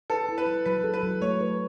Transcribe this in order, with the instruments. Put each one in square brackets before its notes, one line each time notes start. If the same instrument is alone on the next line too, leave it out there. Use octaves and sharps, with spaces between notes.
[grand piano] A4 [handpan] B4
[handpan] E4
[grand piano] B4
[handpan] F#3
[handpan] F#3 [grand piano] B4
[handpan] A4
[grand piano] B4
[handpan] F#3
[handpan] A3 [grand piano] C#5
[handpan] B4